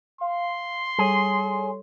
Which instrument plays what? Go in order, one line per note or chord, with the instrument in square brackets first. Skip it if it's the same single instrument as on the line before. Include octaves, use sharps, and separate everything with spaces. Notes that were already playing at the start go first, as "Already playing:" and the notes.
[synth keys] F5 [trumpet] C6
[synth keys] G3 A4 C#5 [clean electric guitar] G#4